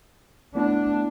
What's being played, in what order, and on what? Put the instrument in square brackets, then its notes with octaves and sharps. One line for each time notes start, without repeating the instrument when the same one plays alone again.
[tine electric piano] A3 B3 E4 [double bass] D4